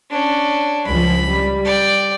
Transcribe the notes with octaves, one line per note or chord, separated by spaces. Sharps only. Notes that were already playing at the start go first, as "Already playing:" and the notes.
C#4 D4
C#2 F3 B5
G3
D5 G5